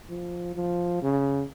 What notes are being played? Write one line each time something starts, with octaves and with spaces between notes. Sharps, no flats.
F3
F3
C#3